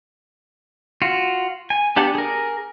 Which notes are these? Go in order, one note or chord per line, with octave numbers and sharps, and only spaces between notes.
F4 F#4
G#5
B3 D4 G4 F#5
G#4 A#4